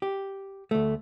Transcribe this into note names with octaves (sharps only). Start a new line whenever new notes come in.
G4
D2 A3